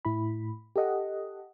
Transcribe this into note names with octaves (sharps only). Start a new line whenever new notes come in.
A2 E4 B5
G4 A4 D#5 F#5